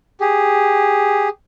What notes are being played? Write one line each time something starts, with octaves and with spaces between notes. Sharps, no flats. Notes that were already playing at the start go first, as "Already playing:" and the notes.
G4 G#4